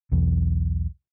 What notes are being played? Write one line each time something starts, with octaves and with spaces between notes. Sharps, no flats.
B1 E2